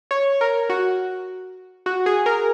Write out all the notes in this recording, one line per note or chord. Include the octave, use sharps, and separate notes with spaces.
C#5
A#4
F#4
F#4
G#4
A#4